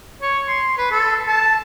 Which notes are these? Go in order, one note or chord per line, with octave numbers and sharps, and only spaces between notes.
C#5
C6
B4
A4
A5